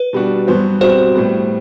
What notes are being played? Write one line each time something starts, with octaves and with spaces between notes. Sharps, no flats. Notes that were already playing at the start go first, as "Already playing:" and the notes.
Already playing: B4
B2 G3 D4 F#4
G2 F#3 B3 F#4 C5
B2 G3 C4 F#4 C5
A2 G3 B3